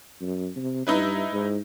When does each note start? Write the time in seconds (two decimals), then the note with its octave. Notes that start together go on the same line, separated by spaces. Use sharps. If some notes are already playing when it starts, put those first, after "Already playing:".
0.21 F#2
0.56 C3
0.87 G2 D#4 E4 B4
1.32 G#2